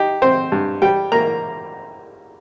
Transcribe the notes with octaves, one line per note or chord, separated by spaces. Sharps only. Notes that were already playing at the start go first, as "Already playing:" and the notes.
Already playing: D#4 G4
C4 C5
G2
G3 G5
A#3 A#5